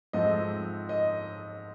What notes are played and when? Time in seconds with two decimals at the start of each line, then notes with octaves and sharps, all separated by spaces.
0.13 G#2 F3 A3 C4 D#5
0.89 D#5